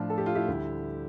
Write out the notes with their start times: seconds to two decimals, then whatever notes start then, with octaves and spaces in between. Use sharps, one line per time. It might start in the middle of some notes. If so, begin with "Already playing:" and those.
Already playing: A2 F3 D4 F4
0.10 A4
0.18 G4
0.26 F4
0.35 E4 G4
0.48 D2 D3 G3